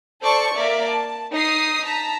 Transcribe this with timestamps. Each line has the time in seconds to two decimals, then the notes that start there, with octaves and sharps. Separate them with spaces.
0.22 A4 C5 D5 A5 C#6
0.56 A#3 A#4 D5 E5
0.86 A5
1.32 D#4 D#6 C7
1.85 A5 A#5 B6